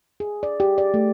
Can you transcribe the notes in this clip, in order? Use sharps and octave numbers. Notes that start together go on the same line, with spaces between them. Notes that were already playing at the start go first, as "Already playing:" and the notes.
G#4
D5
G4
D5
A3